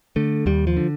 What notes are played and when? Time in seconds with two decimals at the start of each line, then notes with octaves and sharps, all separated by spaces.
0.16 D3 A3
0.46 D#2 G3
0.67 F3
0.76 D3